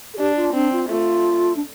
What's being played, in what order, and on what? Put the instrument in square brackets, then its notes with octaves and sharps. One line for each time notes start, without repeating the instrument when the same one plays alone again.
[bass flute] A4
[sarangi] D4 [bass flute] G4
[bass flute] F4
[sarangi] C4 [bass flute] D4
[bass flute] F4
[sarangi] A3 [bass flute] F4
[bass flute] D4